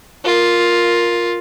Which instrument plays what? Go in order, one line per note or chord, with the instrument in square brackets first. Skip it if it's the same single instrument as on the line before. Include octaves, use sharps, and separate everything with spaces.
[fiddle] F4 A#4